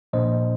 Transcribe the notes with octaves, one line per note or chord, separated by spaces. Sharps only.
A#2 F3 A#3 D4 C5 D#5